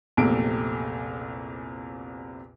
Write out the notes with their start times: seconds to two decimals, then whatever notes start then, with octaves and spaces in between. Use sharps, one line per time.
0.17 A#1 E2 C3 A3 D7